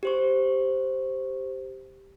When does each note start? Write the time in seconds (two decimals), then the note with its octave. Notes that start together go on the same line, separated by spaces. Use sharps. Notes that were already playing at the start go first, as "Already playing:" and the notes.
0.03 G4 C5 C#6